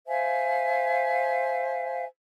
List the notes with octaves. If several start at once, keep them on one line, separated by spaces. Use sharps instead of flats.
C5 E5 F5 G#5